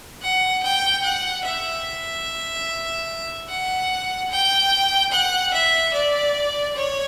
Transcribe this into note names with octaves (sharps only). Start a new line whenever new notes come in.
F#5
G5
F#5
E5
F#5
G5
F#5
E5
D5
C#5